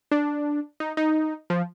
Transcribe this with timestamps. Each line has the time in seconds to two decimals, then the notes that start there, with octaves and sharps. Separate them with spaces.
0.11 D4
0.80 D#4
0.97 D#4
1.50 F3